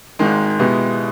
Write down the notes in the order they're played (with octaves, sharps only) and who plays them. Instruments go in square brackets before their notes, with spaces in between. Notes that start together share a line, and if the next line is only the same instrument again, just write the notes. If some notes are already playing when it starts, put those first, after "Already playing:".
[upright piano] G#1 G#2 D#3 G#3
B2 G#3 B3 E4 G4